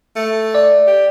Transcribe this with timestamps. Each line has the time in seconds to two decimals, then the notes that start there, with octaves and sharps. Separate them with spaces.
0.16 A3
0.55 D5
0.87 G4